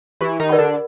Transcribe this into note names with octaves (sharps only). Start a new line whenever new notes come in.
E3 E4 G4
D#3 D#4
A#4 D5 F#5 B5
D3 D4